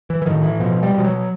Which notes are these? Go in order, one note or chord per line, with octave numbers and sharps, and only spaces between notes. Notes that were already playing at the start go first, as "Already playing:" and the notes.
E3
E3
A2 D#3
E3
B2 F3
G3
B2
F3
F#3